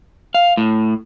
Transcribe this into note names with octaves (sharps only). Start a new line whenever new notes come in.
F5
A2